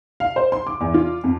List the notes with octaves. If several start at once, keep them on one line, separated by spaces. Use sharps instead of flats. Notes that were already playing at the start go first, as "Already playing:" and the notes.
F5
C5
C6
D6
E2
F4
F2